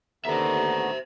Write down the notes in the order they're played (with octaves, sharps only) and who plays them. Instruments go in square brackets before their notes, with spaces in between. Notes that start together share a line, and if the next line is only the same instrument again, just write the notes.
[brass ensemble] D#2 A#5 [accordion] D3 A3 B3 [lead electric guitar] C5 E5